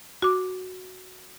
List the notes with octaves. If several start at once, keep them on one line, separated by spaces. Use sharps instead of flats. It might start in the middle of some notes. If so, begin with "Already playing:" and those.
F#4 D6